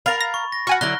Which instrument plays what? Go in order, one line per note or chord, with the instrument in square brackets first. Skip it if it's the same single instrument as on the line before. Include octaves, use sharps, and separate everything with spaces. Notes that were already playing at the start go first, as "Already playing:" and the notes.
[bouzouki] A#4 F5 [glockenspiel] B5 A6
[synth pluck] A#6
[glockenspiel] C#6
A#6
[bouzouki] F#4 [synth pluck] F#5 G#5 C#6 [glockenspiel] F6
[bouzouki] D3 F#3 E4 [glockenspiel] F#6 A#6 G7